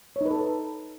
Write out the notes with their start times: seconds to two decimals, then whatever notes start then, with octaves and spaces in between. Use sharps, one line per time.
0.16 C#5
0.21 D#4
0.26 B4
0.31 A4